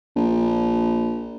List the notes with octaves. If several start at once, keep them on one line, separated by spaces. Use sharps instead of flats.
A#1